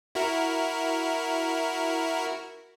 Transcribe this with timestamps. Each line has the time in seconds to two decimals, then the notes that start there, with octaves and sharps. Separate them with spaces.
0.15 E4 F#4 A#4